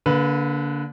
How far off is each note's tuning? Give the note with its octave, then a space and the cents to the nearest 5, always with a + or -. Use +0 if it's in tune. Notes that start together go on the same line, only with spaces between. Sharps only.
D3 -30 A#3 +0 B4 +0